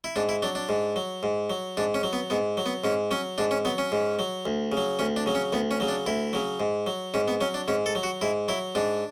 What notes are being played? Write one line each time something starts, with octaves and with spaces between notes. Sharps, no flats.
E4
G#2 D4
E4
F#3 D4
D4
G#2
F#3
G#2
F#3
G#2 D4
C#4
F#3
B3
G#2 B3
F#3
B3
G#2 C#4
F#3 C#4
G#2 D4
C#4
F#3 B3
C#4
G#2
F#3
D2
C#3
F#3
D2 C#4
D4
C#3 F#3
C#4
D2 B3
C#4
C#3 F#3
D4
D2 E4
C#3 F#3
G#2
F#3
G#2 C#4
B3
F#3 C#4
D4
G#2 C#4
A4
F#3
F#4
G#2 E4
F#3 E4
G#2 D4